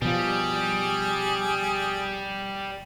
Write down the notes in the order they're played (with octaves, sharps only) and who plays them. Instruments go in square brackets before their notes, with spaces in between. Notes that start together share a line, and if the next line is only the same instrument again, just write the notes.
[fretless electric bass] B2 F3 [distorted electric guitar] G3 [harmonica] G#4